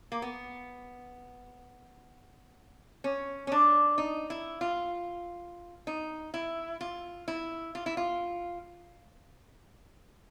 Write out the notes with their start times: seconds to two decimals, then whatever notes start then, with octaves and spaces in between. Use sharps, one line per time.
0.12 A#3
0.22 B3
3.04 C#4
3.47 C#4
3.52 D4
3.98 D#4
4.30 E4
4.61 F4
5.87 D#4
6.34 E4
6.81 F4
7.28 E4
7.75 F4
7.86 E4
7.97 F4